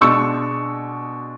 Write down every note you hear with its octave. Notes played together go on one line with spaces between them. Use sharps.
B2 G#3 D4 C#6 E6